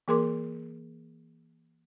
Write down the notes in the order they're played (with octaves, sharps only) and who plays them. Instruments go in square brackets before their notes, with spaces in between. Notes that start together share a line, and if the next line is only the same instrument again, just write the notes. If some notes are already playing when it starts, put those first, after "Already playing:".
[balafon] E3 A#3 G#4 A#4 C6 D6